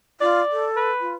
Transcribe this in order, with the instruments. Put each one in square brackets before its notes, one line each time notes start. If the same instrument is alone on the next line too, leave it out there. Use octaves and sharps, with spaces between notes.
[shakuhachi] F4 [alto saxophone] D5
[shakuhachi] A4
[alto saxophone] B4
[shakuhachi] F4